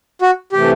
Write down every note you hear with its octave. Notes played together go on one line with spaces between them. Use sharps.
F#4
C3 E3 A3 G4